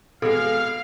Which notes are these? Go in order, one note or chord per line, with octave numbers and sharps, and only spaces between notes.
B2 G#3 A4 F5